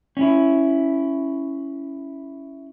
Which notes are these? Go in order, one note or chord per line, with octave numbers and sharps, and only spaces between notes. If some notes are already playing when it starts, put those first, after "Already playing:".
C#4 E4